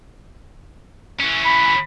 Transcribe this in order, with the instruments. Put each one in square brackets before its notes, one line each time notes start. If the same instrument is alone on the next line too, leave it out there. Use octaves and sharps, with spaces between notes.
[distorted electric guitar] E3 C#4
[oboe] B5